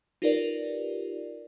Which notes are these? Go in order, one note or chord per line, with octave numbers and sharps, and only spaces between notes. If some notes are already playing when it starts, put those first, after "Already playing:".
D#4 F4 G4 A#4 B4 D5